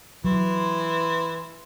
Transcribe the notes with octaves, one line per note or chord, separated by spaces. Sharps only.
E3 F#3 C6